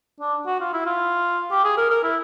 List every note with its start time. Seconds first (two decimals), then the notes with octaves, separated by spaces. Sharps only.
0.20 D4
0.46 F#4
0.60 F4
0.73 E4
0.86 F4
1.51 G4
1.64 G#4
1.78 A#4
1.90 A#4
2.03 E4